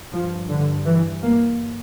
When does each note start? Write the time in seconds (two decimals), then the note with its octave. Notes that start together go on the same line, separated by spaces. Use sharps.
0.13 G2 F3
0.49 D3
0.85 E3
1.22 A#3